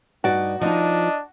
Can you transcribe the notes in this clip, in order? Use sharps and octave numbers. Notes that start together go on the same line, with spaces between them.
G2 D#4 F#4 D5
F3 D4 D#4 D#5